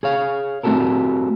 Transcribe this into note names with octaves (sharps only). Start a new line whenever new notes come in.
G#4 C#5 F5
A3 C4 F#4 G4 A4 A#4